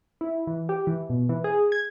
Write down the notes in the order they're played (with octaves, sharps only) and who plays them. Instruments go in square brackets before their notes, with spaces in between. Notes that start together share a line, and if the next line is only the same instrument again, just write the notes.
[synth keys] E4
E3
G4
E3
B2
E3
G#4
G#6